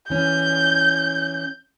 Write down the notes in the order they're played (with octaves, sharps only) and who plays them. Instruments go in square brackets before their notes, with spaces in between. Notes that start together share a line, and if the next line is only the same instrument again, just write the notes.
[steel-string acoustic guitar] E3 C#4 [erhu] G6